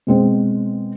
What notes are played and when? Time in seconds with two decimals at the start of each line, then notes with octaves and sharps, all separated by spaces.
0.07 B2 G#3 C4